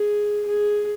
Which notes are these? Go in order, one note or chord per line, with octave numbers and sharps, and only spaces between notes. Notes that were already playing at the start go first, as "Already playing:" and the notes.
Already playing: G#4
G#4